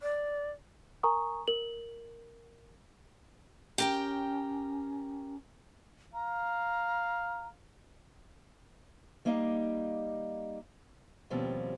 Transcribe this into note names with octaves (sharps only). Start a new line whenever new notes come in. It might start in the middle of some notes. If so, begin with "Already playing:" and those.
D5
A#4 G#5 A#5 C#6 D#6
A#4 F#7
C#4 G4 A#4 G5
F5 A#5
G3 A#3 D#4 D#5 F5
D#2 B2 F3 G3 C4 C#4